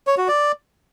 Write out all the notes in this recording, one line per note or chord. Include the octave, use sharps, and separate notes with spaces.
C#5
F#4
D5